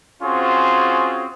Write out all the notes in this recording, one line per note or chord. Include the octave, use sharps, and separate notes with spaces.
C4 C#4 F4 F#4 G#4 C5